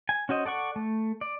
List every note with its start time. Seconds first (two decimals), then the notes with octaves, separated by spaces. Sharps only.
0.09 G#5
0.29 C#4 F#4 C5 D#5
0.45 A4 D5 F#5 C#6
0.76 A3
1.21 D5